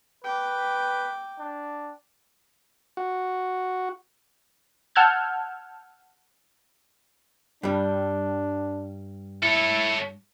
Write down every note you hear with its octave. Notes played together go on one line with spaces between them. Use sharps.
B4 G5 D6
D4
F#4
F#5 A5 E6 F6 G6 G#6
G2 G3 D4
E4 A4 C#5